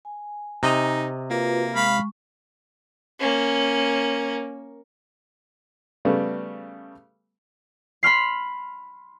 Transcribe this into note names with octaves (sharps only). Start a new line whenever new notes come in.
G#5
C3 D#4 D#5 A#5
A#3 F4 F#4 B4
G#3 F5 B5 C#6
A#3 C#4
C#3 G3 A3 B3
B5 C6 F6 C7